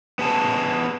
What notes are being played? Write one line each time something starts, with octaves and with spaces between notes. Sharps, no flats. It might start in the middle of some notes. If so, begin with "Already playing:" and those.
B3 G#4 A5